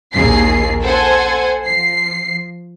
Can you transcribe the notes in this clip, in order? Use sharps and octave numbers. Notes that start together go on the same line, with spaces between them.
A#1 D#2 G#4 C7
A4 C5 F#5 G#5
F3 C7